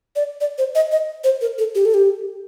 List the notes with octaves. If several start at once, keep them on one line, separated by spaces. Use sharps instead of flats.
D5
D5
C5
D#5
D#5
C5
A#4
A4
G4
A4
G4